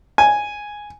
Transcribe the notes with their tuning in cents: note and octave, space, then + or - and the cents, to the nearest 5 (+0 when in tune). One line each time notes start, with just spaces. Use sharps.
G#5 +0